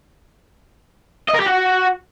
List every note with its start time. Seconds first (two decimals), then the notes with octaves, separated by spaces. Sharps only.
1.29 D#5
1.34 A#4
1.40 G4
1.46 F#4